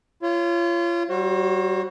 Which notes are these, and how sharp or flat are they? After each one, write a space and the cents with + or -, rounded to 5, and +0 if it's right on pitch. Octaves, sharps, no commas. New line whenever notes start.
F4 -30 C#5 +0
G3 -30 F#4 +0 C5 +40